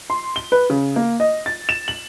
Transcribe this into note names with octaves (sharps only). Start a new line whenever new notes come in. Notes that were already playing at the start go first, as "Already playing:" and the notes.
C6
G7
B4
C#3
A#3
D#5
A6
E7
F#7